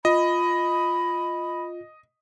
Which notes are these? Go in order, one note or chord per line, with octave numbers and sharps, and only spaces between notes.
F4 D#5 B5